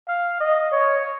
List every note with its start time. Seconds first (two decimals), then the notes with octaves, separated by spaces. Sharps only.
0.08 F5
0.40 D#5
0.72 C#5